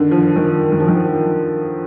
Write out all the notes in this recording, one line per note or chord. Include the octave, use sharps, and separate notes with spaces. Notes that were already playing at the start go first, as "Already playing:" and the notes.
Already playing: D3 D#3
F3
D#3
D#3
F3
D#3